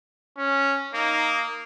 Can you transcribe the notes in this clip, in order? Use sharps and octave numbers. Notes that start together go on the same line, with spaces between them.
C#4
A#3 D#4